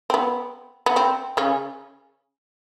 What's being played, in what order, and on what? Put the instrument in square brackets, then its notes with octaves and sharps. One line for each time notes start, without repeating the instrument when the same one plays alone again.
[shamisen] C4
B3
B3
C4
C#3 C#4